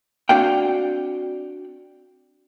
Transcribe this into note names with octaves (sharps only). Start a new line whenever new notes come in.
C4 D4 F#4 D5 F5 G5